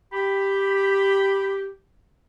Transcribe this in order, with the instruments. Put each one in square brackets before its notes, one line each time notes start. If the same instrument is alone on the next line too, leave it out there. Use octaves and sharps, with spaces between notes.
[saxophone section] G4 [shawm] B5